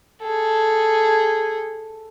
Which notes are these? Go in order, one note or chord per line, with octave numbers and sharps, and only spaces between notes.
G#4 A4